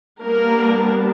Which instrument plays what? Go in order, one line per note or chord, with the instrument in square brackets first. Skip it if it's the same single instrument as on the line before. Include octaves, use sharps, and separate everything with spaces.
[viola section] G3 A#3 B3 D4 A#4